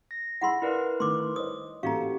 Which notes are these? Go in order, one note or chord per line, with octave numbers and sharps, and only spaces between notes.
A#6
E4 G#4 F#5 B5 C6 E6
E4 A#4 B4 D5 F5
D#3 A3 C6 D6
C5 C#5 D#5 D#6
A1 A#3 F#4 G4 A4 F5 A#5